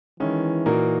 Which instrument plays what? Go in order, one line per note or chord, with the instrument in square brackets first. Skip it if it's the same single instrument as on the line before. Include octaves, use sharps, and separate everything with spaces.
[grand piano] D#3 G#3 C#4 E4 [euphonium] E3
[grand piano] A#2 A#3 D#4 F#4 A#4